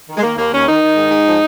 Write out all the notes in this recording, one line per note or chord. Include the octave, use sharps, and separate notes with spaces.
D#3
G#3
D#3 A#3
D#2 A#3
D#2 C#4
D#3 D#4
D#3
G#2
G#2
F3